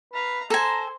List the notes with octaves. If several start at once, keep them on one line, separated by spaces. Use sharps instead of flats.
B4 F5 A#5
A4 C5 G#5 A#5